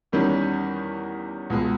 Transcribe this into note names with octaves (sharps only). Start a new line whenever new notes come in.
E2 D#3 G3 C#4
C#2 B2 G#3